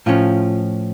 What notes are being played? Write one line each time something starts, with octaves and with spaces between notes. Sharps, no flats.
A2 F3 C#4 F4